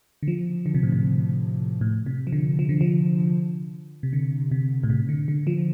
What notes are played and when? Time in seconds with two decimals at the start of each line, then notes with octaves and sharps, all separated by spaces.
0.23 D3
0.28 F3
0.66 D3
0.74 C3
0.83 A2
0.92 C3
1.81 A2
2.06 C3
2.27 F3
2.32 D3
2.59 F3
2.69 D3
2.81 F3
4.03 C3
4.13 D3
4.52 C3
4.84 A2
4.90 C3
5.09 D3
5.28 D3
5.47 F3